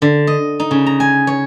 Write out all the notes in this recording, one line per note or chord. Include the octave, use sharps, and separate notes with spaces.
D3
D#5
D#4
C#3
A#5
G#5
C#5